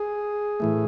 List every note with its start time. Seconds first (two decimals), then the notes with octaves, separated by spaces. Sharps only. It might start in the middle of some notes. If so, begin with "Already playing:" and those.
Already playing: G#4
0.60 A2 E3 A3